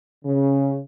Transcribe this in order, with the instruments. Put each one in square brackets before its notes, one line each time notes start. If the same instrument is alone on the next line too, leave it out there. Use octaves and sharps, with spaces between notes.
[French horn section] C#3